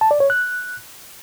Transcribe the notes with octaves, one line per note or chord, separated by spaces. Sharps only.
A5
D5
C#5
F#6